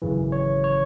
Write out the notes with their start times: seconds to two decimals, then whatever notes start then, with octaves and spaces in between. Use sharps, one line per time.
0.02 G#1 F#2 C#3 E3
0.32 C#5
0.64 C#5